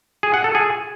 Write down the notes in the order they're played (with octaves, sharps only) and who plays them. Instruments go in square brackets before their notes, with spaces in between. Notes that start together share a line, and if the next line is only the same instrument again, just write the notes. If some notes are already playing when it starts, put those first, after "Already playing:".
[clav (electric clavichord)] G#4
F#5
A4
G#4